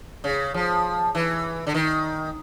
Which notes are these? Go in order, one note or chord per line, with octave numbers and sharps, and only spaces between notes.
C#3
F3
E3
D3
D#3